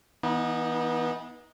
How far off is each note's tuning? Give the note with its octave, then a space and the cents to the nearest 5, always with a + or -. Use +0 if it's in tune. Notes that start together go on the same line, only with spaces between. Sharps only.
E3 -30 B3 -25 D#4 +10